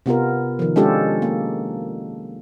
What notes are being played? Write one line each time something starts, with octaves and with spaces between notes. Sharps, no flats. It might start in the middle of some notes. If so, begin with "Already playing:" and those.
C3 B3 F4 A#4
D#3 F3
G#3 C#4 D4 F4 G4 A4
A#3